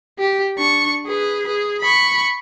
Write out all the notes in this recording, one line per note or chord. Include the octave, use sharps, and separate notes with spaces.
G4
D4 C#6
G#4 B4
G#4
B5 C#6